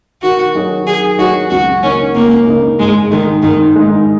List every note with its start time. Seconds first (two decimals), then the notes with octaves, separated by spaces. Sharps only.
0.22 D#3 F#4
0.54 F#3 D#4 G#4 C#5
0.86 D#3 G#4
1.19 F#3 D#4 F#4 G#4 C#5
1.50 C#2 F#4
1.83 C#3 A#3 C#4 D#4
2.15 C#2 A#3
2.47 C#3 A#3 D#4
2.79 G#2 G#3
3.11 D#3 G#3 D#4
3.42 G#2 D#3
3.75 G#3 D#4